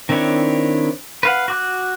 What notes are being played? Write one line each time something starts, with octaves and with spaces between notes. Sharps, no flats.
D#3 C4 D4 E4 C#5
B4 F5 F#5
F#4 D6 F#6